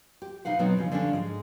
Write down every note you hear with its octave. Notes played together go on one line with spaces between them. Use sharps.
G4
C3 D#4 B4 F5 F#5
B2 F#3 B3 C4 D#4
C#3 F3 C#4
D3 F3 G3 C#4 D4
G#2 G#3